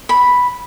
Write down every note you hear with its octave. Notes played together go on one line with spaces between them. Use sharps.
B5